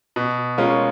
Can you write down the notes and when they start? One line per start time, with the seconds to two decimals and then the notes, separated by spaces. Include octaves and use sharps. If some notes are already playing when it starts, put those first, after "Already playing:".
0.16 B2
0.58 G#3 C#4 F4 A#4